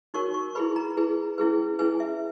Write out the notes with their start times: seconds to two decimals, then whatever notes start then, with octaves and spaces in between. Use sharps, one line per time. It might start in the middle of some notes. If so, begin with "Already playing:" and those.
0.14 D#4 F#4 A#4 C#5 C#6
0.34 C#6
0.55 E4 G#4 B4 B5
0.76 A#5
0.97 E4 G#4 B4
1.38 C#4 E4 G#4 B4
1.79 C#4 E4 G#4 B4 G#5
2.00 E5